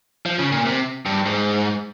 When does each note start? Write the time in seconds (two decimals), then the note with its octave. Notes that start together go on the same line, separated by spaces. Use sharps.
0.26 F3
0.39 C#3
0.52 A#2
0.66 C3
1.06 G2
1.26 G#2